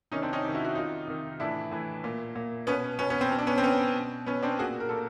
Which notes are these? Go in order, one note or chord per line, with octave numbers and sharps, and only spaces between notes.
C3 D#3 C#4 D#4
C4 D4
C#4 D#4
C3 D#3
E4 F#4
E4 F#4
C3 D#3 D#4 F4
C3 D#3
A2 E3 D4 E4
A2 E3
A#2
A#2
B2 B3 C#4
B2 B3 C#4
B3 C#4
C4
B2
D4
B3 C#4
C4
B2 B3 C#4
B2
B2 B3 C#4
C4 D4
A#2 F#4 G#4
A#4
A#2 A4